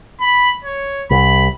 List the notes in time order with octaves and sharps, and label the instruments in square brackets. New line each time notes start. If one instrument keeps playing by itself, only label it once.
[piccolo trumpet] B5
C#5
[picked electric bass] C2 [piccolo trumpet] B5